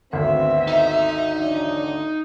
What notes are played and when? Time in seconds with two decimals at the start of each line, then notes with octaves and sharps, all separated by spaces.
0.13 G#1 D2 B3 C4 E5
0.68 D#4 D#5
1.35 E2 F#3 D4